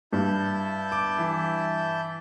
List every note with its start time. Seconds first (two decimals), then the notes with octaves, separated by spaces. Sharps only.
0.13 G2 E4 A5 G6
0.92 D6
1.19 E3